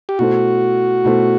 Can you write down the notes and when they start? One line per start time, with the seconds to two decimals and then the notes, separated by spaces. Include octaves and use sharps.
0.09 G4
0.19 B2 A3 E4 F#4 A4 C5
1.05 B2 A3 E4 A4 C5